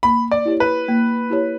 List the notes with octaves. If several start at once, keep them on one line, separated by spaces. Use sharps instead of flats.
A#3 B5
D5
E4 G4 C#5
B4
A#3
E4 G4 C#5